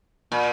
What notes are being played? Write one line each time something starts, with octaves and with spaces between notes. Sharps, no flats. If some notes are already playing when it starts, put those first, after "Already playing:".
A#2